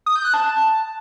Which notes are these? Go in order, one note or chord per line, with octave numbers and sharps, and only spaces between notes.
D#6
G6
F#6
A5